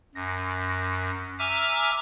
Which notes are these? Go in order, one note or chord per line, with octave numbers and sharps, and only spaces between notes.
F#2 A#6
E5 G#5 A#5 D6 E6 F6